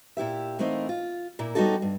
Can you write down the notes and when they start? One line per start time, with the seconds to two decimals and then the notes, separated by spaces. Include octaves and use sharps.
0.17 A#2 E4 G4 E5
0.59 E3 A3 A#3 C4 D#4
0.89 F4
1.39 A#2 A#3 E4
1.55 G3 B3 C#4 D#4 F#4 A4
1.82 G2